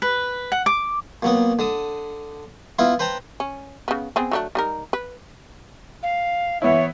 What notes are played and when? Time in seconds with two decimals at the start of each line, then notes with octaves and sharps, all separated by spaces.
0.02 B4
0.52 F#5
0.66 D6
1.22 A#2 F#3 B3
1.59 D3 A5 D#6
2.79 B3 E4 F4
2.99 B4 C5 G5 A5 A#5
3.40 C#4
3.88 C#3 B3
4.16 B3 C4 G#4
4.31 F#3 A3 D4
4.55 G3 D#4 A#4
4.93 B4
6.03 F5
6.62 E3 B3 E4 C#5 E5